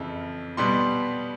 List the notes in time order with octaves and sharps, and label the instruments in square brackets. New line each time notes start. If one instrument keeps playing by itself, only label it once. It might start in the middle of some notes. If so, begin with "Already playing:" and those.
Already playing: [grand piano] F2 C#3 E3
B2 G3 B3 C6